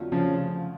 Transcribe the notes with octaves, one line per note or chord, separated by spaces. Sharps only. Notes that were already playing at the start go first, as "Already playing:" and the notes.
Already playing: F2 D3 F#3 A3 F4
C#3 F3